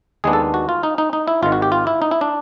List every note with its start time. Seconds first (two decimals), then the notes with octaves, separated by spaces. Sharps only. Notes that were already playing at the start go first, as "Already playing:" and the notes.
0.24 D#2 D#3 G#3 B3 D4 G#4
0.33 A4
0.54 F#4
0.69 F4
0.83 D#4
0.98 D#4
1.13 D#4
1.28 E4
1.42 G#1 G#2 D#3 F4
1.52 F#4
1.62 G4
1.72 F4
1.87 E4
2.02 D#4
2.11 E4
2.21 D4